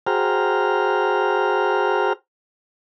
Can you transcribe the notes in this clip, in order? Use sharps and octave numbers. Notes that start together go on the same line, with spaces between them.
F#4 G#4 C5 G5 A#5 F6